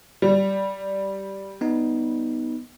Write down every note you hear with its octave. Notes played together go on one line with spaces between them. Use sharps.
G3
B3 D#4